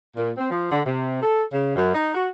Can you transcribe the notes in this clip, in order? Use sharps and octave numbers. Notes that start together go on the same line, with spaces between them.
A#2
C4
F3
D3
C3
A4
C#3
F#2
D#4
F#4